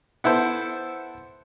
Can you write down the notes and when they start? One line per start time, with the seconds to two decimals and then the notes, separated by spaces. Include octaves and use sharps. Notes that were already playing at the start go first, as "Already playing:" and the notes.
0.24 B3 E4 A4 C5